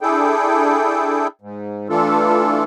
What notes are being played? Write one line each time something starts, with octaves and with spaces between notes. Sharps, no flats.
D4 E4 G#4 A4 G5
G#2
E3 A3 D4 F4 A4